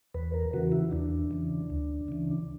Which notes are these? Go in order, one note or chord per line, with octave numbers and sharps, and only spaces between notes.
E2 B4
A#4
C#3 E3 F#4
E4
E2 D4
C#3 E3
D2
C#3 E3